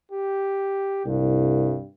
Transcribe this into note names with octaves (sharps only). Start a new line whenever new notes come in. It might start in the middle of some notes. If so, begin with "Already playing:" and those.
G4
C2 G2